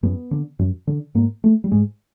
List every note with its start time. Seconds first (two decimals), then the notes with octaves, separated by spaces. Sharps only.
0.03 F#2 B3
0.31 D3
0.59 F#2
0.87 D3
1.15 G#2 A#3
1.44 A3
1.64 G3
1.71 G#2 G#3